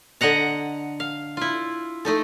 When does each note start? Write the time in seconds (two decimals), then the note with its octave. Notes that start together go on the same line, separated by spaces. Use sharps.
0.21 D3 D#5 F#5 A#5
1.00 F5
1.37 E4 F4
2.05 A3 D#4 A4